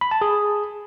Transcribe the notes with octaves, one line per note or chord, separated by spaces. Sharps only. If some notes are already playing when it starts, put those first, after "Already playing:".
B5
A5
G#4